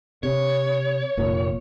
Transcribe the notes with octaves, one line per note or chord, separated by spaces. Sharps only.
C3 C#5
F1 A#2